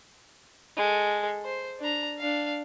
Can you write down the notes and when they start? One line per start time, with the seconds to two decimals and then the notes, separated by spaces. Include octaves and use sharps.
0.77 G#3 A4
1.44 C5
1.80 D4 A#5
2.18 D4 F5